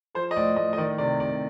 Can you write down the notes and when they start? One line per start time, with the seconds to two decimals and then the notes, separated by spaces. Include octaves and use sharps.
0.15 F3 C5
0.31 D#5
0.36 A2 D5
0.56 A2 D#5
0.73 D#5
0.77 D#3 D5
0.98 C3 D5
1.20 C3 D5